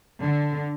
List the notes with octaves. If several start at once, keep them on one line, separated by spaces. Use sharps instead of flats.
D3